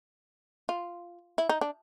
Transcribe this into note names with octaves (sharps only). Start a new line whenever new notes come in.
F4
E4
D#4
D4